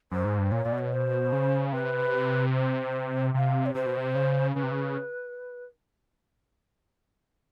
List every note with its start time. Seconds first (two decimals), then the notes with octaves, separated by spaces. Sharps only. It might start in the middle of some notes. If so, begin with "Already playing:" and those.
0.11 F#2 C5
0.25 G#2
0.38 G2
0.52 A#2 C#5
0.65 A#2 D5
0.72 B2
0.78 C#5
0.92 C5
1.33 C#3
1.72 C3 B4
2.53 C5
3.34 C3 F5
3.66 C#5
3.74 C3 C5
3.86 B2
3.97 C3
4.15 C#3
4.55 C#3 B4
4.63 C3
4.71 C#3